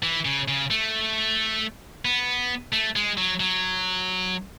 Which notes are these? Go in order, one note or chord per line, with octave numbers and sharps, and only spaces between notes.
E3
C#3
C#3
A3
B3
A3
G#3
F#3
F#3